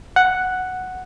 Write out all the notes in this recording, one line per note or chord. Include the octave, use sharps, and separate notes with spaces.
F#5